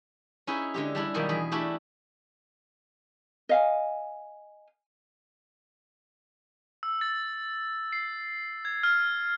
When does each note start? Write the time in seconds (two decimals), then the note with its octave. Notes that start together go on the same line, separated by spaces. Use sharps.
0.47 C#4 D#4 E4 G#4 B4
0.74 D3 G#3 G4
0.95 G3 D4 E4
1.14 B2 D#3 F#3 G3 A#3
1.29 E2 G#4 B5
1.51 A3 D4 E4 F#4 G4
3.49 D#5 F5 G#5
6.83 E6
7.01 A6
7.92 C7
8.65 G#6
8.83 F6